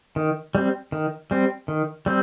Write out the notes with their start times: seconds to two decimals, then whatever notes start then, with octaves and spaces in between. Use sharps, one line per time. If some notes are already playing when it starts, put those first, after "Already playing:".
0.16 D#3
0.55 G3 C4
0.92 D#3
1.31 G3 C4
1.68 D#3
2.06 G3 C4